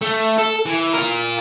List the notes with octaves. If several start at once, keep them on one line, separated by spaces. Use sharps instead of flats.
A3
A4
E3
F4 A#4